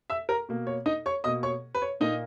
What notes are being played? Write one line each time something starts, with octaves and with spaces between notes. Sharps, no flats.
E5 E6
A#4 A#5
B2 A#3
C#5
D#4 D#5
C#5 C#6
B2 A#3 D#5 D#6
C#5 C#6
B4
C#5
A#2 A#3 D#4 D#5